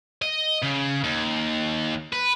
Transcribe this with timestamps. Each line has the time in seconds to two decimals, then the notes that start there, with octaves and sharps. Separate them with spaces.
0.22 D#5
0.63 C#3
1.04 D#2
2.13 B4